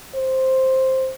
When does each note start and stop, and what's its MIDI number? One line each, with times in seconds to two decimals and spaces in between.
0.15 1.12 72